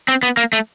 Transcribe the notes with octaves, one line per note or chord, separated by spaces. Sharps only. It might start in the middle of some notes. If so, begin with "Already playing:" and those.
C4
B3
A#3
A3